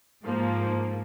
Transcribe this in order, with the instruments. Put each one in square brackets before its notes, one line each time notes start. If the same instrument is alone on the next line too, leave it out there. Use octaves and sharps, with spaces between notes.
[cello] G#2 [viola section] F3 A#3